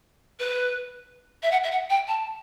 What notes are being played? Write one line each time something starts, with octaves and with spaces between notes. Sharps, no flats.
B4
E5
F#5
E5
F#5
G5
A5